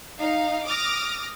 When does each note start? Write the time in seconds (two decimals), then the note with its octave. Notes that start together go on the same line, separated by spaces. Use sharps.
0.20 D#4 F5
0.66 D6 D#6 F6 A#6